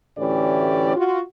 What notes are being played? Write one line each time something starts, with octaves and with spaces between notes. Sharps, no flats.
D2 A2 E3 C#4 G4 D5
F4 F#4